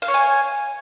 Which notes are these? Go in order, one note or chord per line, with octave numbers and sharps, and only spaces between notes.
F5
C#5
G#5